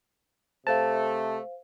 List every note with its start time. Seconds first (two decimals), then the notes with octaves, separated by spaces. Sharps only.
0.67 C3 A3 C5 F5 A5